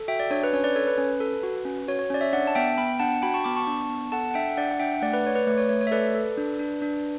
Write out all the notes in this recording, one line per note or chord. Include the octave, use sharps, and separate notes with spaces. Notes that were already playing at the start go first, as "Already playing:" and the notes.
Already playing: A4
F#4 E5 G5
D5
D4 C#5
B4
C#4 C#5
B4 D5
A4 C#5
B4
C#4
A4
F#4
C#4
F#4 C#5
C#5
C#4 D5
C#5 E5
D4 D5 F#5
A5
B3 E5 G5
B3 G5 B5
D4 F#5 A5
F#4 G5 B5
A5 C#6
B3 B5 D6
A5 C#6
D4
B3
A4 F#5 A5
F#5
D4 E5 G5
D4 D5 F#5
F#5
D4 E5 G5
A3 D5 F#5
B4 D5
A3 C#5
B4 D5
A3 B4
C#5
A3 C#5
C#5
E5
A4 B4 D5
A4
D4
D4
D4